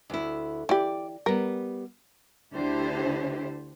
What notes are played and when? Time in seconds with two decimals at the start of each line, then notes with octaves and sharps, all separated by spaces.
0.10 D2 E4
0.69 E3 G4 D5
1.26 G3 B3 A#4
2.53 D2 D3 D4 E4 G4 C5